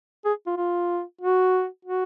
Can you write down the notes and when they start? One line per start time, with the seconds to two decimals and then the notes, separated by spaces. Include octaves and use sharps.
0.25 G#4
0.47 F4
0.57 F4
1.21 F#4
1.85 F#4